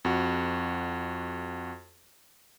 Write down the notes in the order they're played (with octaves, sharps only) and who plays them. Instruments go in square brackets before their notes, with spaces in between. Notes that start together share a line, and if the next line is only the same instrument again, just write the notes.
[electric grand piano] F2 F#4